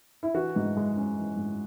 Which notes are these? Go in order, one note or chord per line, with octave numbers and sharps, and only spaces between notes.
E4
E3 F#4
G#2
G#3
C#4
E3
G#2